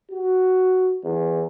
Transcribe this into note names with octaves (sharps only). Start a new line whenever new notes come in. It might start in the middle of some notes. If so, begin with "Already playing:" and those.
F#4
E2